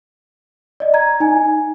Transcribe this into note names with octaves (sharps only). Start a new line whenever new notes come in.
D5 D#5
A#5 G#6
D#4 G#5